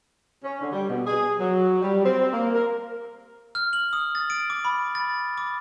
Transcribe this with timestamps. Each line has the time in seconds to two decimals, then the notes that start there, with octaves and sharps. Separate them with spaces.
0.44 C#4
0.61 D3
0.73 G3
0.90 B2
1.06 G#4
1.39 F#3
1.82 G3
2.04 C4
2.33 A#3
2.55 A#4
3.55 F6
3.73 F#7
3.93 D#6
4.15 A6
4.30 D7
4.50 D6
4.65 B5
4.95 A6
5.37 D6